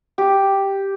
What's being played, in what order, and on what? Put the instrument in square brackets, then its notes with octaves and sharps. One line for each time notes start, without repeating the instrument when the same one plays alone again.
[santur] G4